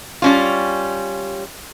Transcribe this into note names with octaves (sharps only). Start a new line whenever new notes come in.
G3 C#4 F4